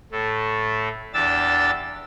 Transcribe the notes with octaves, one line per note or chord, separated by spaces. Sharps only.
A2 A3
E2 D4 G4 E6 A6